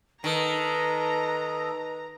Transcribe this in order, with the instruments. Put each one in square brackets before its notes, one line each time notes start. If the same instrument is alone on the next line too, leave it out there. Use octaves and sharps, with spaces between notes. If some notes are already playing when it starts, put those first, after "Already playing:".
[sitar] D#3 [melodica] A4 D#5 [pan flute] B4 [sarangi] A#5